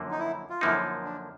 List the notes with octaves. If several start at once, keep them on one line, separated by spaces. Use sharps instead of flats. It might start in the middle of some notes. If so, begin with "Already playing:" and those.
Already playing: F#2 D3 F3 A#3
D#4
E4
F4
F#2 D3 F3 A#3 D#4 E4
D4